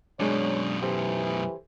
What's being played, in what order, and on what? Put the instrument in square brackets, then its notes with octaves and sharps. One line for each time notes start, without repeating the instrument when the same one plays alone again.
[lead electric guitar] F#2 B2 [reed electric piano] G#3 D4 D5 [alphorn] C#5
[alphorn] E3 [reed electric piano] G4 A4 C5